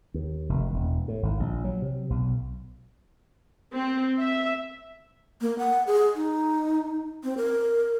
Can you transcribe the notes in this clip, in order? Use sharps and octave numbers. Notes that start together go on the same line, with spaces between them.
D#2
F1
E1
A2
G#1
A#1
F#3
C3
B1
C4
E5
A#3
F#5
G#4
D#4
C4
A#4